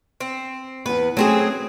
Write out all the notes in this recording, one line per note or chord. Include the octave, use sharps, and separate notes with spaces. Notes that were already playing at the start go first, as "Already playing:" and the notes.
C4
E2 B3 B4
F#3 A3 C4 C#4 G#4